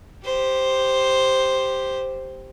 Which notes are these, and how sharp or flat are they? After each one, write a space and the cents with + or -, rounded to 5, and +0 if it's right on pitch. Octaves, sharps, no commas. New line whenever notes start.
G4 +0 C5 +0